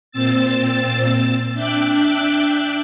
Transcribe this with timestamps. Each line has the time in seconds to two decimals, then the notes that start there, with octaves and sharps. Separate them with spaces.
0.11 A#2 C4 E6 A6
1.54 D4 E5 G5 D6 F#6